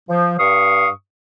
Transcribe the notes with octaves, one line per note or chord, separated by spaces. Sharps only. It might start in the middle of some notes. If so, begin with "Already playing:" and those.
F3
G2 F5 C#6 D#6